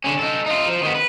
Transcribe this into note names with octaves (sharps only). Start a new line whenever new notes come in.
D3 C#4
D#4 A4
D#4 F4
F3
D#3 B3
B4